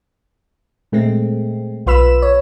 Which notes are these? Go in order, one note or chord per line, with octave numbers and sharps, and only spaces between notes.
A#2 G#3 A3 C4
B1 F4 B4 B5 E6 E7
C#5